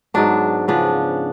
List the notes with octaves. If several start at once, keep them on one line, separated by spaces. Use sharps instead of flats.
G#2 F#3 B3 D4
C#3 F3 B3 D4